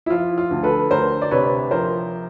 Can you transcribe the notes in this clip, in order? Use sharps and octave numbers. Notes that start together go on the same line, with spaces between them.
E4
F3 F4
F4
D2
A4 B4
D2 A#4 C5
D5
C3 B4 C#5
F3 A#4 C5